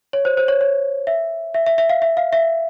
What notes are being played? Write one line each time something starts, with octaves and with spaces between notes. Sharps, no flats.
C#5
C5
C5
C#5
C#5
E5
E5
E5
E5
F5
E5
F5
E5